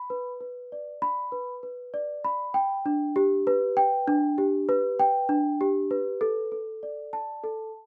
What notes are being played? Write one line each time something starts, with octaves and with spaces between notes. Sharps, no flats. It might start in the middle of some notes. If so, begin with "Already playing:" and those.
Already playing: B5
B4
B4
D5
B5
B4
B4
D5
B5
G5
D4
G4
B4
G5
D4
G4
B4
G5
D4
G4
B4
A4
A4
D5
A5
A4